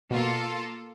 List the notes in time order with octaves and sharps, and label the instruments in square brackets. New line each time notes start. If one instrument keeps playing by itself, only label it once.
[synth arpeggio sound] B2 [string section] A#3 F4 A4